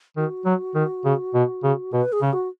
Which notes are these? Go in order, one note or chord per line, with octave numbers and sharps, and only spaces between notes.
D#3 F#4
F#3
D#3
C#3
B2
C#3
B2 B4
G#4
C#3
F#4